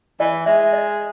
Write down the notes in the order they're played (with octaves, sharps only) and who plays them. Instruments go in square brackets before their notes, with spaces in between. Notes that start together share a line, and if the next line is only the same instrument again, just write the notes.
[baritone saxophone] E3 [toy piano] D#5
[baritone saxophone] G#3 [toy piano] E5
[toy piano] D#5